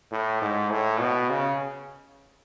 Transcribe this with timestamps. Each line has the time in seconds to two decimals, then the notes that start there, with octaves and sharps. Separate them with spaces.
0.12 A2
0.42 G#2
0.71 A2
1.00 B2
1.30 C#3